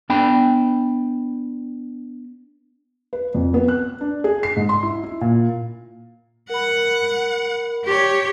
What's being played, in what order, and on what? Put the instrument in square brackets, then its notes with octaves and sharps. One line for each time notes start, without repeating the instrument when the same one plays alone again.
[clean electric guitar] B3 D4 G5 A5 B5
[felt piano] B4
F2
B3
F#6
D4
G#4
C7
G#2
C6
E4
E4
A#2
[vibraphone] A#4 B5 [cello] F#5
[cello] G4 C#5